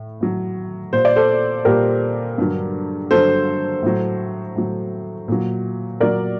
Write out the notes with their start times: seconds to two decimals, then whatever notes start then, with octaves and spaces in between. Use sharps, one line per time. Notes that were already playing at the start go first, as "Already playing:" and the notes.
Already playing: A2
0.21 A2 F#3
0.93 A#2 G3 C5
1.05 D5
1.16 A4 C5
1.65 A#2 G3 G4 A#4
2.38 G2 D3 F#3
3.11 G2 D3 F#3 A4 C5
3.83 A2 F#3
4.56 A2 F#3
5.28 A#2 F#3
6.00 A#2 F#3 A#4 D5